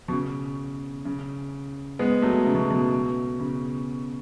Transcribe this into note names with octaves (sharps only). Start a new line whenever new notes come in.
B2
C#3
C#3
G#3 B3
F#3 A3
C#3
B2
B2
C#3